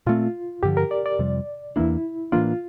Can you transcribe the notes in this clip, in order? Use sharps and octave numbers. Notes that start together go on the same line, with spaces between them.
A#2 A3 C4 F4
G2 D3 F3 G4
A#4
D5
D5
F2 C3 G3
E2 E3 A#3 D4 E4
A2 E3 A#3 D4 F4